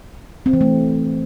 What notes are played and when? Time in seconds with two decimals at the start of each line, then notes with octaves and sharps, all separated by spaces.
0.46 C4
0.53 E3
0.61 A3